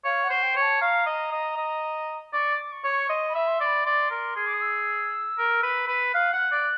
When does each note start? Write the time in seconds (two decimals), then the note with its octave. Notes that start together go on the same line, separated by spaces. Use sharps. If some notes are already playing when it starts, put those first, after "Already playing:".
0.04 C#5 F5
0.24 F#5
0.30 C5
0.43 G5
0.56 C#5
0.62 A5
0.81 F5 A#5
1.06 D#5
1.32 D#5
1.57 D#5
2.33 D5 C#6
2.53 D6
2.72 C#6
2.84 C#5
2.90 C#6
3.09 D#5 C6
3.29 B5
3.35 E5
3.47 C6
3.61 D5
3.66 B5
3.86 D5 C6
4.11 A#4
4.36 G#4
4.47 D6
4.54 D#6
4.61 E6
5.38 A#4
5.63 B4
5.88 B4
6.13 F5 F#6
6.33 F#5
6.51 D5